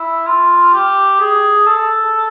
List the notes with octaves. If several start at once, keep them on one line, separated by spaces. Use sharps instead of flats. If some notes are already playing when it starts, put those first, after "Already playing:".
Already playing: E4
F4
G4
G#4
A4